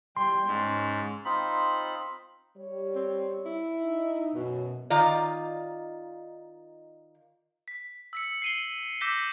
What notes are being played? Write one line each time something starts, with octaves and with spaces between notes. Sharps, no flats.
G3 G5 C6
G#2 C#4
C4 D#4 F4 B5
G3 C#5
C4
E4
D#4
F#2 B2
D#3 D#4 F4 D5
B6
E6 B6 C#7
C7 D#7 G7
D6 E6 G6 A#6 B6 G7